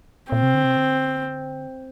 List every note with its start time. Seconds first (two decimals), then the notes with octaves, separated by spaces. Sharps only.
0.32 A#2 C4
0.43 C3
0.54 D3
0.64 C3
0.76 D3